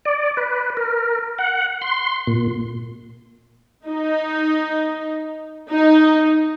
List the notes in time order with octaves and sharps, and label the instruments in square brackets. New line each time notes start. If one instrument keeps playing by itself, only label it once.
[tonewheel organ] D5
B4
A#4
F#5
C6
A#2
[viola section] D#4
D#4